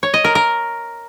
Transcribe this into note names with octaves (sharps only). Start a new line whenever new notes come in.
C#5
D#5
A#4
A#4